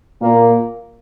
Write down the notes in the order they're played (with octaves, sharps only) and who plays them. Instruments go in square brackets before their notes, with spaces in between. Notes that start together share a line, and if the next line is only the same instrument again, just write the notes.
[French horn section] A#2 A#3